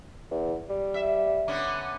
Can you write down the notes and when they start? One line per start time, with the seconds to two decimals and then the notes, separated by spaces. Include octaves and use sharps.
0.31 E2
0.70 G3
0.94 E5
1.48 D3 B3 C#4